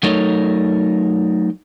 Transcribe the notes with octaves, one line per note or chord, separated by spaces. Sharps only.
F#3 A3 D#4 A4 A#4 C#5